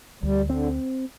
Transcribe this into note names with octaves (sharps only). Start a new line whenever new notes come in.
D2 G3
D3 C4